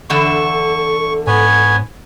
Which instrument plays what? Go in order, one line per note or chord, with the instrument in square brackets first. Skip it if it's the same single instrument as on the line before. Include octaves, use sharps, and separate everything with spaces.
[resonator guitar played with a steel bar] E2 D3 E5 [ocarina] A4 [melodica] C#6
[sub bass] G#2 [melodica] B3 C#5 G#5